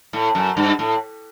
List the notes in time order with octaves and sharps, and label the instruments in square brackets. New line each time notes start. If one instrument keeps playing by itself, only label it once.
[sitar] A2
F#2
G2
A2